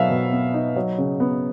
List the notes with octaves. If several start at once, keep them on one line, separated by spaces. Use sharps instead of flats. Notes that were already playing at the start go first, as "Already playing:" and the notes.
Already playing: B2 F#3 B3 D#4 E5 F5
B2
B3
D#4
F#3
C#3
B3